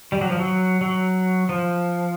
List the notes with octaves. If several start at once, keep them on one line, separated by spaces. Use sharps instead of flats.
G3
F#3
F3
F#3
F#3
F3